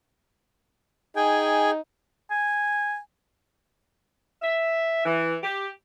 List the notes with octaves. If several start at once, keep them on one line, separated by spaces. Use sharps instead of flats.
D#4 G#4 G5 G#5
G#5
E5
E3
G4